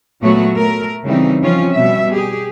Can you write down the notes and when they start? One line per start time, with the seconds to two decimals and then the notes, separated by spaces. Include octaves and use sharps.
0.22 A#2 F#3 A3 B3 F#4 C#5
0.54 A3 A#4
1.05 C#3 E3 G3 C4 D#4
1.42 F3 C4 C#4 F4
1.72 B2 G3 E5
2.13 G4 G#4